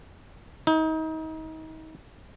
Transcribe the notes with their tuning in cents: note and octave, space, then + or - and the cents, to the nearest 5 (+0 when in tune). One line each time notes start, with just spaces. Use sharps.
D#4 +30